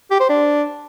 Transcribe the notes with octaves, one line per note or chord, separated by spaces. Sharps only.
G4
C5
D4